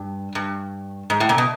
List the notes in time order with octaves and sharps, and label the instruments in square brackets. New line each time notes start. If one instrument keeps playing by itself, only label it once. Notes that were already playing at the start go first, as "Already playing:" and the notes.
Already playing: [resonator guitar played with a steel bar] G2
G2
G#2
A2
A#2
B2